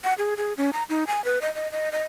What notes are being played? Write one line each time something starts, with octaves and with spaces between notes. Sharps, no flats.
F#5
G#4
G#4
C#4
A#5
D#4
G#5
B4
D#5
D#5
D#5
D#5